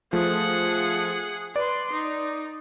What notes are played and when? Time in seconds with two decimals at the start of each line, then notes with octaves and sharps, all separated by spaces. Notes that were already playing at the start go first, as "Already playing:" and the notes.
0.13 F3 A3 G#4 F#5
1.56 B4 D5 C6
1.92 D#4